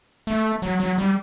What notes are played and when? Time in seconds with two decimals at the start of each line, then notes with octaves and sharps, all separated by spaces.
0.27 A3
0.62 F#3
0.80 F#3
0.98 G3